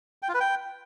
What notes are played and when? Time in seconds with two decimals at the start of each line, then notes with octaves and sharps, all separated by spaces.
0.23 G5
0.28 F4
0.34 B4
0.40 G5